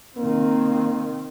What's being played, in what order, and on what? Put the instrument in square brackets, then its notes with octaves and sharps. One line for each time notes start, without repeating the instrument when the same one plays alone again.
[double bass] D#3 C4 [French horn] A#3